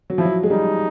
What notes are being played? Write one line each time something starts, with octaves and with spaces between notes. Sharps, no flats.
F#3
F3 E4
F#3
G#3
G3 D#4